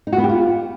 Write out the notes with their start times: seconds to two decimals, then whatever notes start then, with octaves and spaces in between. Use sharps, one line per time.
0.07 D#4
0.13 F#4
0.18 B3
0.24 G4
0.29 F4